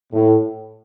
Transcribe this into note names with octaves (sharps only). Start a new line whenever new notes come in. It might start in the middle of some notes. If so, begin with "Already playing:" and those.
A2